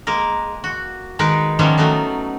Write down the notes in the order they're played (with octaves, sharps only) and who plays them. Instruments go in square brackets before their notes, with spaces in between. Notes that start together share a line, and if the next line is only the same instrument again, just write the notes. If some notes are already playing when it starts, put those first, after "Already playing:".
[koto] G#3 A#3 A#4
F#4
D#3 G#3 D#4 A#4 B4
D#3 F3 G3 B3 C#4 E4
F#3 A3 B3 D#4